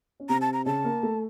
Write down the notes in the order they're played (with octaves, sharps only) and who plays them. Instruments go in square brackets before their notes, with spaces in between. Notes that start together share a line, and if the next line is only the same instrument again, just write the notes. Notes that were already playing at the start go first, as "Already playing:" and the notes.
[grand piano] C#4
[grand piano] C3 C4 [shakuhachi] A#5
[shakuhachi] A5
A#5
[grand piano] C#3 C#4 [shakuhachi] A5
[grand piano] A#3 A#4
A3 A4